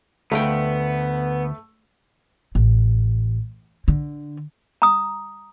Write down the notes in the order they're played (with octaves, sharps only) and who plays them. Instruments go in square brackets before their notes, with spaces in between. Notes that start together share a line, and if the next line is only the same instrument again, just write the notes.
[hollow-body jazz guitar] D2 F5 G5 [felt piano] A3 [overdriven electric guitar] B3
[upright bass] A1
D3
[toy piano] A#5 D#6